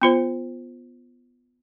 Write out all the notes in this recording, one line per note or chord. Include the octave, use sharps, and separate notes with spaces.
B3 F4 C5